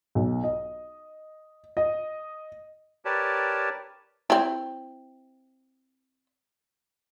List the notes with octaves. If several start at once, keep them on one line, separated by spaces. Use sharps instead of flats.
B1
D#5
D#5
G4 A#4 B4 C#5 D5 A5
C4 E4